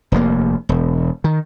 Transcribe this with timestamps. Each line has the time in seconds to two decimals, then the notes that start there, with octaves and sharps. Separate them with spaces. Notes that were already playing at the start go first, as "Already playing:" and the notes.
0.12 F1 D#2 A#3
0.69 E1
1.24 D#3